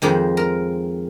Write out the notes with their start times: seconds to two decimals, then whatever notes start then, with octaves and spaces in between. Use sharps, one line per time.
0.02 F2 D#3 G#3 C5
0.37 A#4